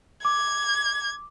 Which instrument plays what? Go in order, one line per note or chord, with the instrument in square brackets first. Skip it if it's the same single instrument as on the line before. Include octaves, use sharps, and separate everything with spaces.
[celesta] D6 [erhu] G#6